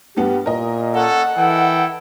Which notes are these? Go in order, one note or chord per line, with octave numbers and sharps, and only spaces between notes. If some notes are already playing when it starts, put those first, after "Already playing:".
G2 B3 G4
A#2 A#4 D#5
C#4 A4 F#5
E3 E4 A4 G5